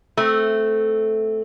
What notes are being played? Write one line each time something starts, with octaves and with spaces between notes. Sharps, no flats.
A3 C4